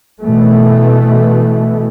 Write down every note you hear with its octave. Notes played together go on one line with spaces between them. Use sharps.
B2 E3 A3